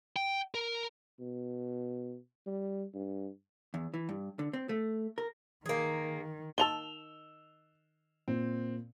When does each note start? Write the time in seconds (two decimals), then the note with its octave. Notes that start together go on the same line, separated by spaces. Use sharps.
0.16 G5
0.54 A#4
1.20 B2
2.46 G3
2.94 G2
3.74 E2
3.94 E3
4.09 G2
4.39 D3
4.53 C4
4.69 A3
5.18 A#4
5.66 D#3 A#3 G#4
6.58 D#3 F4 A5 E6 F7 G7
8.28 A#2 C4